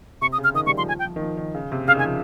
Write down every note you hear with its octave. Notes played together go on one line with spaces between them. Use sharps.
C3 C#6
D#6
C#3
F6
D#3 D#6
G3 C#6
F3 C6
F3 G#5
G5
F3
D#3
F3
D#3
C#3
C3
C#3 F5
D#3
G#5
F3